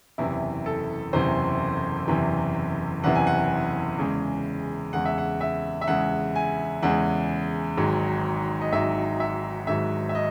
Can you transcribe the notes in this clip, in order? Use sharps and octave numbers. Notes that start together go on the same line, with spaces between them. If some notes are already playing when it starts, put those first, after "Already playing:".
F#1 E2 C3 E3 E4
A4
F#1 E2 C3 E3 C5
F#1 E2 C3 E3
F#1 E2 C3 E3 F#5
G#5
F#5
E2 C#3 G#3
E2 C#3 G#3 F#5
E5
F#5
E5
E5
E2 C#3 G#3 F#5
G#5
E2 C#3 G#3 F#5
G#1 G#2 F#3
D#5
G#1 G#2 F#3 E5
E5
G#1 G#2 F#3 E5
E5
D#5